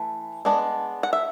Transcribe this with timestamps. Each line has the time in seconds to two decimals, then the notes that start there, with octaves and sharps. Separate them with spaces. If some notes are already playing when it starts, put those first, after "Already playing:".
Already playing: E3 A3
0.45 G#3 B3 D4
1.03 F#5
1.13 E5